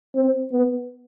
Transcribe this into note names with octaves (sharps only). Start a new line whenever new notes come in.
C4
B3